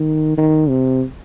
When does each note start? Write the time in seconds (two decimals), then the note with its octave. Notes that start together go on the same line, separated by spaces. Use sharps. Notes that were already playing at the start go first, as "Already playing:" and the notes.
Already playing: D#3
0.37 D#3
0.69 C3